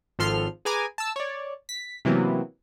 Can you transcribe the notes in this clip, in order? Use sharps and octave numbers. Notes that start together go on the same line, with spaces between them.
G#1 F3 A4 C6 F6 C7
G#4 B4 G#5 A#5 D6
A5 E6
C#5 D5
B6
C3 E3 F#3 A#3 B3